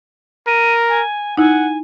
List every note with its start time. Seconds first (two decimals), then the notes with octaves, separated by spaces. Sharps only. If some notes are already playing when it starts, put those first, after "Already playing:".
0.47 A#4 D#7
0.88 G#5
1.37 D#4 E4 F#5 G#5